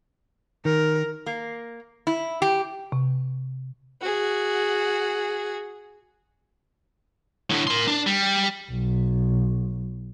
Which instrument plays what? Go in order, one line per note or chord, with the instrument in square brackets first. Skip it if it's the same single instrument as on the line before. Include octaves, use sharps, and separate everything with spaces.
[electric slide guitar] D#3 [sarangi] A#4
[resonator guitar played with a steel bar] A#3
E4
G4
[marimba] C3
[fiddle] F#4 G#4
[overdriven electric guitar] A2 D3
A#4 C6
D4
G3
[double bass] B1